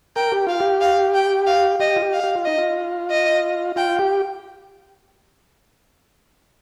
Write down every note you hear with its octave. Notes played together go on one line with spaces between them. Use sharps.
A#4 G5
G4
F4 F5
G4
F5
G5
F5
G4 D#5
F4
G4
F5
G4
F4
D#4 D#5
F4
D#5
F4 G5
G4